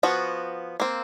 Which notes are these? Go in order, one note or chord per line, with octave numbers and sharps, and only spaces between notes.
F3 B3 F#4
A#3 C4